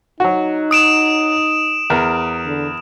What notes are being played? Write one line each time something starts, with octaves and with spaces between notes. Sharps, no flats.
F#3 D#4 F#4
D#6 D7 E7
E2 A#4
D3